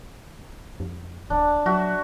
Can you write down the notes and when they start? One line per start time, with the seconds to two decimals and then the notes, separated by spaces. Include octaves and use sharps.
0.80 F2
1.30 D1 D4
1.66 F#3 F#4 E5